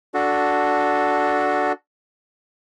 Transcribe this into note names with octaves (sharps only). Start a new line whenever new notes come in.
D4 F#4 A4